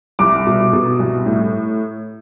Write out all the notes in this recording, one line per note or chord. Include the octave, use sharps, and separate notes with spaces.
C2 D6
B2
B2
C2
A2